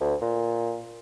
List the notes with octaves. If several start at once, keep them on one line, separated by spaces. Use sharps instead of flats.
D2
A#2